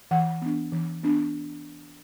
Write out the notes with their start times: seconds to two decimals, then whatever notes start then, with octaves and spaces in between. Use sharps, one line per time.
0.11 E3 F#5
0.42 B3 D4
0.72 E3
1.03 B3 D4